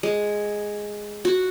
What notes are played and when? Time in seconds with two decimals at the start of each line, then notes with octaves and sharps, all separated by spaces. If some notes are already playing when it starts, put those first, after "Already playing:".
0.03 G#3
1.25 F#4